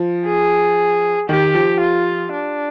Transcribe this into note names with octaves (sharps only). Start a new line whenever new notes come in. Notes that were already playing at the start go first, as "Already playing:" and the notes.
Already playing: F3
G#4
D#3 G4
F3
F4
D4